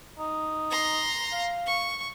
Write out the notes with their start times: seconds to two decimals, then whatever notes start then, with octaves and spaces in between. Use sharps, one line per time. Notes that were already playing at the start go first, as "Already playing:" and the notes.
0.19 D#4
0.71 A#5 C6
1.32 F5
1.66 C#6